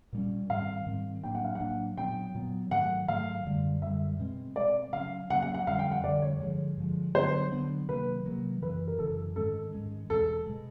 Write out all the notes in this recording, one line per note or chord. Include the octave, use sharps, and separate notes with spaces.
A#2 G3 A#3 C#4
G#2 D#3 G3 C4 F5
G#2 D#3 G3 C4
A2 F#3 A#3 D4 G5
F#5
F5
F#5
A2 F#3 A#3 D4
A#2 F#3 B3 G5
A#2 F#3 B3
G#2 D#3 F#3 A3 F#5
G#2 D#3 F#3 A3 F5
F#2 D3 G3
F#2 D3 G3 E5
B2 G#3 C4
B2 G#3 C4 D5
C#3 F#3 A#3 C#4 F5
C#3 F#3 A#3 C#4 F#5
F#5
F#5
F2 D3 G3 F5
G5
F#5
F2 D3 G3 D5
C#5
G2 D3 F3 G#3 C#5
G2 D3 F3 G#3
D3 F#3 B3 D4 C5
D3 F#3 B3 D4
C3 D#3 F#3 A#3 B4
C3 D#3 F#3 A#3
F#2 C#3 E3 B4
A#4
F#2 C#3 E3 A4
G#2 D#3 G#3 C#4 A4
G#2 D#3 G#3 C#4
E2 B2 G#3 A4
B2 G#3